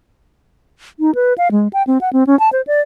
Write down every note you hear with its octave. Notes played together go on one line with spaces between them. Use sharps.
D#4
B4
F5
G#3
G5
C4
F#5
C4
C#4
A5
C5
D5